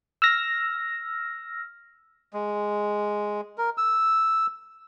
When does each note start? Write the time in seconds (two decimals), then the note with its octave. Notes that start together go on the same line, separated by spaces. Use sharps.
0.22 E6 F6 A#6
2.33 G#3
3.58 A#4
3.77 E6